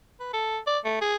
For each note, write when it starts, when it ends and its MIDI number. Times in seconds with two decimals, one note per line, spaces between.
0.20 0.31 71
0.33 0.59 69
0.67 0.79 74
0.85 0.97 57
1.01 1.16 68